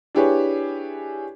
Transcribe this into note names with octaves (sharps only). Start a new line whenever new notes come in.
D4 E4 G4 G#4 B4 C#5